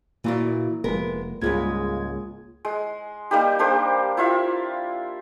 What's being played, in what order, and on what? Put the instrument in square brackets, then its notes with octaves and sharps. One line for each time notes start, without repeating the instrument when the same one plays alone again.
[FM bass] A#2 [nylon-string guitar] E3 F#4 D5 [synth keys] A#3
[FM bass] F1 [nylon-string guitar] G#3 B3 A#4
[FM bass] C#2 [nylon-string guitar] G#2 G3 G#3 [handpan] A#3 F4 G#4 [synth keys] G#6
[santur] G#3
G3 A#3 D#4 G4
D4 G4 A#4 C5
E4 F4 E5